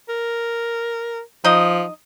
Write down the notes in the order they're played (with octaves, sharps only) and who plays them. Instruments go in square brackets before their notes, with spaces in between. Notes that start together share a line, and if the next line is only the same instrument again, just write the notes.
[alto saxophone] A#4
[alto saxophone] F3 [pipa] D#4 D#5